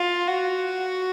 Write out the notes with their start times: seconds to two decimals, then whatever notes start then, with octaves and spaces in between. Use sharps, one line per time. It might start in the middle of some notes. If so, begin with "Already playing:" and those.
Already playing: F4
0.27 F#4